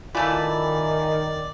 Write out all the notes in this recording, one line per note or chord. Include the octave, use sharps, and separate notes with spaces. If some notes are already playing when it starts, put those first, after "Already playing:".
D#3 E3 A3 F4 A4 D5 G#5 B5